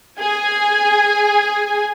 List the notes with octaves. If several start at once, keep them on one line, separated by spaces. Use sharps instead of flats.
G#4 G#5